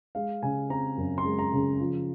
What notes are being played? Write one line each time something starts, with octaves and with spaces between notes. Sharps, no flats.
G#3 F5
C#3 G#5
C4 A#5
F#2
C6
G#3
A#5
C#3
F3